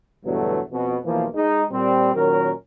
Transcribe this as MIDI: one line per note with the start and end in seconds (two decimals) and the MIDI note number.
0.25 0.60 40
0.25 0.60 43
0.25 0.60 47
0.25 0.60 50
0.25 0.60 54
0.25 0.60 57
0.72 0.96 41
0.72 0.96 47
1.05 1.26 35
1.05 1.26 52
1.05 1.26 53
1.05 1.26 58
1.34 1.62 56
1.34 1.62 63
1.71 2.10 46
1.71 2.10 55
1.71 2.10 60
2.15 2.51 46
2.15 2.51 51
2.15 2.51 54
2.15 2.51 61
2.15 2.51 70